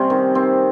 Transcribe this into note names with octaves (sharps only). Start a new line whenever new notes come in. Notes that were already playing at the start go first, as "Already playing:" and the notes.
Already playing: C3 G3 C4 C#4
D#3
C4